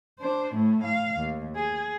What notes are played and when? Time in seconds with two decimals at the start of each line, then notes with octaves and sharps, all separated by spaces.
0.19 D4 C5
0.54 A2 A3
0.84 F5
1.17 D#2
1.56 G#4